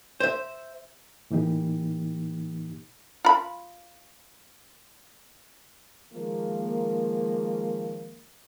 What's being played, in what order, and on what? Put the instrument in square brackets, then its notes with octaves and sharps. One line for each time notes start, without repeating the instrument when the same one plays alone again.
[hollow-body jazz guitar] C5 E5
[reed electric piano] A2 E3 A#3 D#4 G4
[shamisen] F4 B5
[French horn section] D#3 F3 G#3 A#3